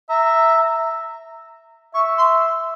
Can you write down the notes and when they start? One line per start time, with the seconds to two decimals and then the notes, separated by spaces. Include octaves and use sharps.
0.09 E5 A#5
1.94 E5 C#6
2.18 C6